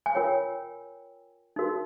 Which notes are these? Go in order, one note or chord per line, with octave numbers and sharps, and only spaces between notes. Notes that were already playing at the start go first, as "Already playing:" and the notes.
G#5
F4 A#4 C#5 G5
D#4 F#4 A#4